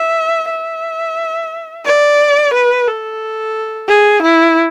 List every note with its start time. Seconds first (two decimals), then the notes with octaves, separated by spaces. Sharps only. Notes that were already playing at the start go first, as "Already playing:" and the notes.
Already playing: E5
0.50 E5
1.85 D5
2.54 B4
2.87 A4
3.88 G#4
4.22 E4